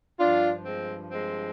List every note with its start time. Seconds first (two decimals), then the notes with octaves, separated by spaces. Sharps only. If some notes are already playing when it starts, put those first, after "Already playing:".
0.19 G2 F3 D4 F4
0.65 G#3 C4
1.12 G#3 C4